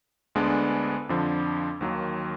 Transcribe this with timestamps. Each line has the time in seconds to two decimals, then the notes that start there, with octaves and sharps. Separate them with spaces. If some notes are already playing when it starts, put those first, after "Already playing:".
0.35 D2 D3 G#3 B3 D4
1.09 F2 D3 F3
1.81 D#2 D#3 F#3 A#3